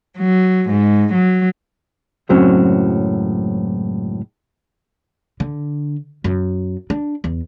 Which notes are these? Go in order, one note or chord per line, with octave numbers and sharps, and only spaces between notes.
F#3
G#2
F#3
C#2 F#2 A2 F#3 C4 C#4
D3
F#2
D4
E2